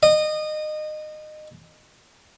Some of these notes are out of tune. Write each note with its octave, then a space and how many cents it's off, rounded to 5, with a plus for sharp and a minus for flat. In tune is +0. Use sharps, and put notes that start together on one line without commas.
D#5 -25